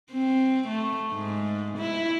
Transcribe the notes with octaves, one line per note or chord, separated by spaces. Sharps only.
C4
A3
G#2
E4